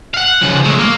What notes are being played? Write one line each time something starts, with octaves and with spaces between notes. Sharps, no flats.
F5 F#5
C#3 F3
G#3 A3
A#3